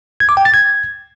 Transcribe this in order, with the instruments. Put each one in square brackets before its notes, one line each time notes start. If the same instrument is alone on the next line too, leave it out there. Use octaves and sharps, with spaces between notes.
[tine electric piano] G#6
D6
G5
A6
G#6